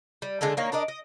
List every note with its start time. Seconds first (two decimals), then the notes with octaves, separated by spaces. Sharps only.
0.22 G3
0.41 D3 G#3 A3 A4
0.57 D#3 A#3 C#5
0.72 D4 A#4 D5 D#5
0.88 D#5